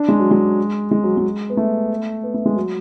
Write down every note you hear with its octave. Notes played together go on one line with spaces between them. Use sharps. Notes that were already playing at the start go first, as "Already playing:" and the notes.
Already playing: D4
G#3
F#3
G#3
G#3
F#3
G#3
B3
A3
B3
A3
G#3
F#3